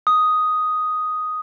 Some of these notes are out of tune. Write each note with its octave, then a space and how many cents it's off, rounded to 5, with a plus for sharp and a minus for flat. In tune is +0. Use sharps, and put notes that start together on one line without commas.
D#6 +5